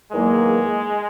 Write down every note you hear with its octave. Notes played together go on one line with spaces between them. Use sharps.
E2 D#3 F#3 G#3 A#3